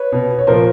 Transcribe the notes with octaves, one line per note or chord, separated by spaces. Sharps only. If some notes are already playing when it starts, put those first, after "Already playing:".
Already playing: B4 C#5
B2
C#5
A#2 F3 A#4 C5